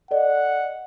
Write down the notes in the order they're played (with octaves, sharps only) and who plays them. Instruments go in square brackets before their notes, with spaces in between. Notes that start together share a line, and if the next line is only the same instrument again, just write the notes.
[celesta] A4 D5 D#5 [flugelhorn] F#5